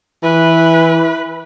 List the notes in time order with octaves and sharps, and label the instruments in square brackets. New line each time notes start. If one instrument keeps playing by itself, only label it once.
[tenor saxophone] E3 [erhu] B4